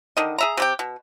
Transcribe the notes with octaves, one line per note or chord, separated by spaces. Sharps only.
D3 D#3 D#5
G#4 E5 A#5
C3 G4 G5
B2